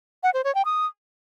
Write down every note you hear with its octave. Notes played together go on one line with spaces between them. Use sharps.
F#5
C5
C#5
G5
D#6